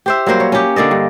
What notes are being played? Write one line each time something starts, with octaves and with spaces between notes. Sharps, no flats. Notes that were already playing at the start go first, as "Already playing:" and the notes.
G4 C5 E5
F#3 G3 A#3 C5
C#5
C#4 G4
D3 A#3 D5 D#5
G2